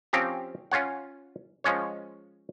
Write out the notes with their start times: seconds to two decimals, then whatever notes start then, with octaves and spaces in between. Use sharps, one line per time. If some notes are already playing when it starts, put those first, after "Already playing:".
0.13 F3 C4 C#4 G4 A#5
0.72 C#4 F4 C#5 F#5
1.64 F3 G#3 C#4 C#5